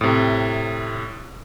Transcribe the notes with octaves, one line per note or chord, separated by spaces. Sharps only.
A2 C3